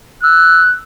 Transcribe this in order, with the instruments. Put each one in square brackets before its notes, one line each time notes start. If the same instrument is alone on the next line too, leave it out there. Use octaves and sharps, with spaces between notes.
[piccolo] E6 [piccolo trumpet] F#6